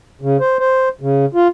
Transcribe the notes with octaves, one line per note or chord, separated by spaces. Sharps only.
C#3
C5
C5
C#3
F4